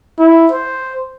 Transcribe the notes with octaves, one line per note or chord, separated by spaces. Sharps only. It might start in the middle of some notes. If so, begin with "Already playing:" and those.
E4
C5